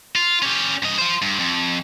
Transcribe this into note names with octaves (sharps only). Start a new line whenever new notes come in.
F4
C#4 G4
G2 D#5
F4 C5
G2
F2